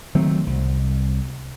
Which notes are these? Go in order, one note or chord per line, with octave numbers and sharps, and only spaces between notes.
D#3 F#3 A3 C4
C2